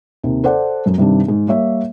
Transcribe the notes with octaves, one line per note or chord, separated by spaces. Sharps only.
D#2 C3
A4 C5 D5 F#5
F#2 F#3
G2 C3 D#3 G3 D4
G#2
G3 A#3 C#5 E5